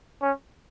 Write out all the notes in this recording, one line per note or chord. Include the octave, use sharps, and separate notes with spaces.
C#4